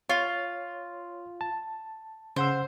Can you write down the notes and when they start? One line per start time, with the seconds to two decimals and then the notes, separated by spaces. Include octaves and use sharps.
0.09 F4 C#5
1.41 A5
2.36 C#3 C5 F#5 E6